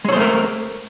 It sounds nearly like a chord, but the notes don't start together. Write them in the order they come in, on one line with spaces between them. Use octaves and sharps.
G#3 C#5 C5 A3 A#4